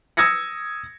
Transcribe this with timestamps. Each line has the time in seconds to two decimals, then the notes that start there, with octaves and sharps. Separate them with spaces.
0.17 D#6 E6 G#6 A#6 C#7